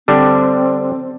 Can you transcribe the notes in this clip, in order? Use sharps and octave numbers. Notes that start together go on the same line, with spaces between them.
D3 G3 C4 D4